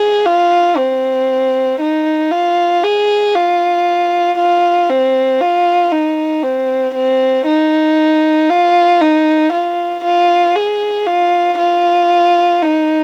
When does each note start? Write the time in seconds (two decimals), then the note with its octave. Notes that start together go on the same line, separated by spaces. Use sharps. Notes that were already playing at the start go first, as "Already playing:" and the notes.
Already playing: G#4
0.26 F4
0.77 C4
1.81 D#4
2.31 F4
2.84 G#4
3.35 F4
4.38 F4
4.90 C4
5.41 F4
5.92 D#4
6.43 C4
6.95 C4
7.47 D#4
8.50 F4
9.01 D#4
9.53 F4
10.05 F4
10.56 G#4
11.07 F4
11.58 F4
12.62 D#4